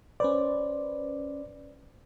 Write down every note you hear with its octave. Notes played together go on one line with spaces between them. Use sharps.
C#4 B4 C5 D5